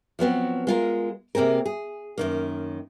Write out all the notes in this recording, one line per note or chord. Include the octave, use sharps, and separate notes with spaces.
F3 F#3 B3 C4
G#3 F4 A#4
C3 A#3 C4 G#4 A#4
G#4
F#2 D#3 A#3